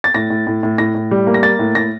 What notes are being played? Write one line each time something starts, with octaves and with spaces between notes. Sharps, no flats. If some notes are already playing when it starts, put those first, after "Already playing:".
A6
A2 A#6
A2
A2
A2
A2 A#6
A2
G3
A#3
A#6
A#3 A6
A2
A2 A#6